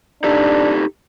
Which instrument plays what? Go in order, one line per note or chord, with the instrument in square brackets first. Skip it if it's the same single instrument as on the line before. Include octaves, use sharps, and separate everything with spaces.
[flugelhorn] D4 [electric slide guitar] D#4 G4 A4